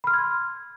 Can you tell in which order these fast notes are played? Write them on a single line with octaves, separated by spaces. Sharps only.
B5 F6 C6 G#6